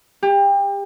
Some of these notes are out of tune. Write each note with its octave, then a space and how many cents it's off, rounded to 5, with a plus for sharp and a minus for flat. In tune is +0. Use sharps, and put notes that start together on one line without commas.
G4 +30